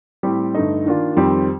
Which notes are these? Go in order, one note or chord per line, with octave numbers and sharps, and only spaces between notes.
A2 G3 C4 G4
G2 D3 A3 D#4
D#3 A#3 D4 F4
F2 D#3 G3 C4 G4